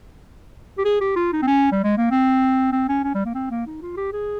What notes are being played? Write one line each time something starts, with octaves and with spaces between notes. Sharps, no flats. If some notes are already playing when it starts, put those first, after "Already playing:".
G4
G#4
G4
F4
D#4
C4
C#4
G3
G#3
A#3
C4
C4
C#4
C#4
G3
A#3
C4
A#3
D#4
F4
G4
G#4